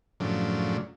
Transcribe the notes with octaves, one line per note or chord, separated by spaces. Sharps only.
F#2 A2 C#3 F3 D4